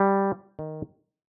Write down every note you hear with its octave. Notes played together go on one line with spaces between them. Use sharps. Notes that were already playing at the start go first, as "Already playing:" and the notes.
Already playing: G3
D#3